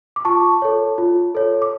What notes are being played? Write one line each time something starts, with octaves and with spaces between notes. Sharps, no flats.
D6
F4 A5 C#6
A4 C#5
F4
A4 C#5
D6